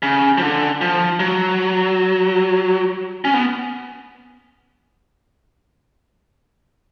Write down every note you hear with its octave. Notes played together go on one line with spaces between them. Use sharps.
C#3
F3
D3
F3
F#3
C#4
B3